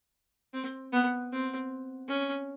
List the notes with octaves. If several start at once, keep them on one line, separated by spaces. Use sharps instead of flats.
C4
B3
C4
C#4